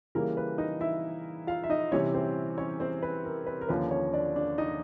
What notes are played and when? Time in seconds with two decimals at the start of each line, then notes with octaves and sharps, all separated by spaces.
0.15 C#3 E3 G3 A#3 A#4
0.37 B4
0.58 D#4 D#5
0.81 E4 E5
1.47 F4 F5
1.64 E5
1.70 D#4 D#5
1.92 C3 E3 G3 C#4 C#5
2.15 C4 C5
2.58 C#4 C#5
2.80 C4 C5
3.02 B4
3.25 A#4
3.47 B4
3.61 A#4
3.69 D#2 D3 F3 A#3 C#4 B4
3.91 C#4 C#5
4.13 D4 D5
4.36 D4 D5
4.58 D#4 D#5